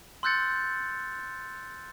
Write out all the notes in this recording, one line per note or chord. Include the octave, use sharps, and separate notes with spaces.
C6 E6 F#6 G6 A6 C#7